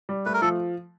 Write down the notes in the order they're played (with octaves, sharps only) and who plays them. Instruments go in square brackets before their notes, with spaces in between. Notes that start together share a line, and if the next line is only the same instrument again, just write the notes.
[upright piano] G3
[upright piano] A3 [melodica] B4
[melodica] A#4
[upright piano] F3 [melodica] A4